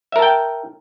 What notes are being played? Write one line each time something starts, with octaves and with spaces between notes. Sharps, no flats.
A#4 E5 G5 A5